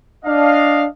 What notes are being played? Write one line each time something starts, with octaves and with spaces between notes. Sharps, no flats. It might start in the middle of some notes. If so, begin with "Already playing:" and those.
D4 D#5 F5